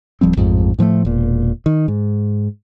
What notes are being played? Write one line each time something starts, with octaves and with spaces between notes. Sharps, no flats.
D1 F3 G3 C4
A1 F2 G#2
A2 F3 G#3 A3
E1 A#2
D#3
G#2